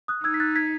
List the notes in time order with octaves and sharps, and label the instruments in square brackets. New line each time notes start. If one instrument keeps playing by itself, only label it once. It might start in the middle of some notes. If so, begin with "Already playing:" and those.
[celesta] D#6 F#6
[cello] D#4 [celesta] E6 G#6
[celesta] B6
F#6 A6
G#6 B6